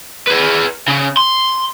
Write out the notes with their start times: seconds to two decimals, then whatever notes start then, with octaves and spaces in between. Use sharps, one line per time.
0.27 G#4 B4
0.88 C#3
1.17 C6